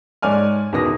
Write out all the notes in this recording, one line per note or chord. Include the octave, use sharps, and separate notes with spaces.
G#2 C#5 D5 G#5 F6
E2 B2 D#3 D#6 A#6